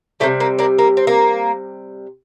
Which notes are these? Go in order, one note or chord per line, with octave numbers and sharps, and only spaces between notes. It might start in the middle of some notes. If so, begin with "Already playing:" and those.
C3 D#3 G3 A3
A#3
A#3 D4
A#3
C4
A#3